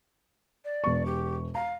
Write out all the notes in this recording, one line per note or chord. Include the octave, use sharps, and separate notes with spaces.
D5
E1 B3 C#6
G4
F5 A#5